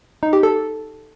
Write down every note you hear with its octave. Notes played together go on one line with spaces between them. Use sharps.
D#4
G4
A4